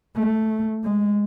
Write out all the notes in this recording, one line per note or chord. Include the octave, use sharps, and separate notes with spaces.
A3
G#3